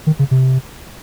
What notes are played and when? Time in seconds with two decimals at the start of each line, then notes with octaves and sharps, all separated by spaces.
0.07 D#3
0.19 C#3
0.31 C3